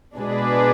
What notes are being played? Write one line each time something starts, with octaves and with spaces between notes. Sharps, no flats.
B2 G#3 D4 G#4 B4